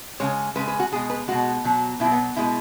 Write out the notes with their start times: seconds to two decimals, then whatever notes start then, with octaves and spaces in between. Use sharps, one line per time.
0.20 C#3 G#3 C#5
0.56 C#3 G#3 B4
0.68 B4
0.80 F#4
0.92 B2 G#4
0.96 G#3
1.10 B4
1.28 B2 G#3 F#4
1.64 B2 F#3
2.00 B2 E4
2.05 F#3
2.12 B3
2.36 B2 G#3 E4